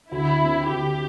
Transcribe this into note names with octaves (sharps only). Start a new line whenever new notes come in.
D2 E4
D3 C4
D2 G4